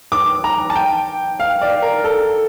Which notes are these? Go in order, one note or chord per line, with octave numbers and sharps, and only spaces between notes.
D6
A#5
A5
G5
F5
D5
A#4
A4